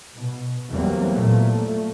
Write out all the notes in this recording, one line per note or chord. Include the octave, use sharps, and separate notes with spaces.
B2
E2 E3 F#3 G3 A#3 C4
A#2 A3